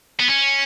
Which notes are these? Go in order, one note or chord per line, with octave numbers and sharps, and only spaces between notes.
B3
C#4